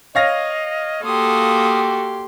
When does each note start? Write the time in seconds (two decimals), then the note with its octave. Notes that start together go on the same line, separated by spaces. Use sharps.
0.15 C#5 D#5 F5 A#6
1.04 A#3 F#4 G4 A4 C6 D#6